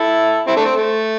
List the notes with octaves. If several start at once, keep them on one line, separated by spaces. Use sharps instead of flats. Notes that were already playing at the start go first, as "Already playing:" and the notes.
Already playing: E4 A4
C4 E4
A3 D4
C4
A3